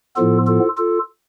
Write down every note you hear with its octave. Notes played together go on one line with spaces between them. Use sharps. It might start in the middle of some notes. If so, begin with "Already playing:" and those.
A2 F3 B3 F4 A4
F4 A4
F4 A4